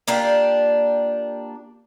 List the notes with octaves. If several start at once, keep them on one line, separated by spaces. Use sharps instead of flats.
A#3 D4 F4 G4